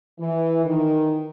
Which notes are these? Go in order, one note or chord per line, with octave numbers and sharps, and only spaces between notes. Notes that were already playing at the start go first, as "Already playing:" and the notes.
E3
D#3